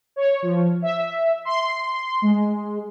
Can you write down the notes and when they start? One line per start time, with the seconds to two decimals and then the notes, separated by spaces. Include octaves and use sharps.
0.16 C#5
0.42 F3
0.82 E5
1.45 C6
2.22 G#3